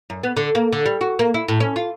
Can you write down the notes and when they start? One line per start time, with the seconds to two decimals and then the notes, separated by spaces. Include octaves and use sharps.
0.10 F#2
0.23 B3
0.37 D3
0.55 A#3
0.73 D3
0.86 G3
1.01 F#4
1.19 A#3
1.34 E4
1.48 A2
1.60 C#4
1.76 F4